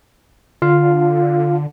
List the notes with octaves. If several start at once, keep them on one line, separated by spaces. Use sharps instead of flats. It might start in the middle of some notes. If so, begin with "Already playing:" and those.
D3 F4 F5